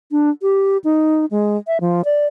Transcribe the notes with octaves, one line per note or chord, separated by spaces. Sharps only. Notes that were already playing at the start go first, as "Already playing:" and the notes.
D4
G4
D#4
G#3
E5
F3
D5